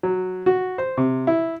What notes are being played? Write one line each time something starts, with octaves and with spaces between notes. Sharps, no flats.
F#3
F#4
C5
C3
E4